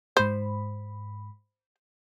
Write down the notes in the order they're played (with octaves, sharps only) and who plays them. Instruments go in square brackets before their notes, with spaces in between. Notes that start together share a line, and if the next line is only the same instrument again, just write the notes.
[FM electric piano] G#2 B5 [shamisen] C5